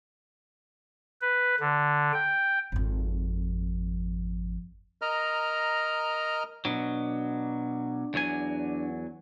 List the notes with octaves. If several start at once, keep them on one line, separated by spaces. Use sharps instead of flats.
B4
D3
G5
G#1 F2
A#4 D#5 A#5 F6
B2 F#3 D4
E2 F#3 G#5